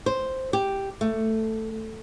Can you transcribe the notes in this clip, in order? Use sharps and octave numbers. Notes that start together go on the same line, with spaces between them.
C5
G4
A3